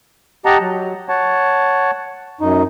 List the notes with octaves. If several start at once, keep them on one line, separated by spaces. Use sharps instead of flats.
G4 D#5 F#5 A5 A#5
F#3
C#5 F#5 A5
F#2 D#4